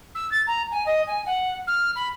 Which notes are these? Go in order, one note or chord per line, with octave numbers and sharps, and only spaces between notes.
E6
A6
A#5
G#5
D#5
G#5
F#5
F6
B5